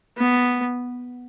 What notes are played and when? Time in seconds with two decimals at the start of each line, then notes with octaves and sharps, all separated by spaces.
0.18 B3